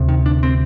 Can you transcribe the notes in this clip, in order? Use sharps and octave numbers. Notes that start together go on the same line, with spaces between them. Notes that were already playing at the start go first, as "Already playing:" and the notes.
Already playing: D2 C3
D#3
D4
C4